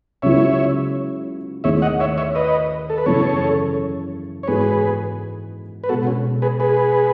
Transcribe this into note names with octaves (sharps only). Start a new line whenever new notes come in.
C#2 C#3 F#3 B3 E4 C#5 E5
D#2 D#3 A3 E4 G#4 C#5 E5
D#5 F#5
C#5 E5
C#5 E5
B4 D#5
A4
B4
F#2 C#3 E3 A4 C#5
C#5
G#2 E3 B3 F#4 G#4 A4 B4
B4
B2 G#3 B3 F#4 A4
C#4
G#4 B4
G#4 B4